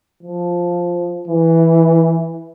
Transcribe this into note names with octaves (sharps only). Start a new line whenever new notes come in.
F3
E3